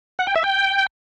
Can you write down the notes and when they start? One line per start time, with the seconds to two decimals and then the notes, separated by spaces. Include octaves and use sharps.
0.19 F#5
0.27 G5
0.36 E5
0.44 G5